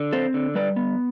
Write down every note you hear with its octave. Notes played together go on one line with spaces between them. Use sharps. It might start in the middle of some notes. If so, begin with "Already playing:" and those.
Already playing: D3
C4 A4 C5
D3
G3 B4 D5
B3